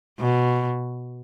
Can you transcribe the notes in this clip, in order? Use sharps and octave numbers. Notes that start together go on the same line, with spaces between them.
B2